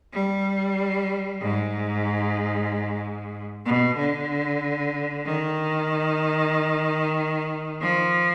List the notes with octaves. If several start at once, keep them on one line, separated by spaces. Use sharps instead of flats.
G3
G#2
B2
D3
D#3
F3